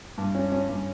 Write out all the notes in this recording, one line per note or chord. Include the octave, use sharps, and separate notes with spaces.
G2
C#4
C#4
G2